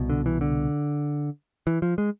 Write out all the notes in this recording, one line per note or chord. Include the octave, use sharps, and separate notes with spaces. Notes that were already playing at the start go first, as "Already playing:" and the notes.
Already playing: C2 B2
D3
E3
D3
E3
F3
G#3